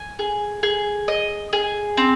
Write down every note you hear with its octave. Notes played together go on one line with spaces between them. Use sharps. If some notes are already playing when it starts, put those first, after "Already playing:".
Already playing: G#5
G#4
G#4
D#5
G#4
C4